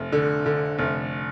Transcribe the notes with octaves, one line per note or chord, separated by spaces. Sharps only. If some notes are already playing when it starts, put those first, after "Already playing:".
Already playing: F1
D3
D3
F1